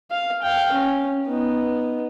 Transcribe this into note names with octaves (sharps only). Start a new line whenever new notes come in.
F5
F5 G5
C#4
B3 D#4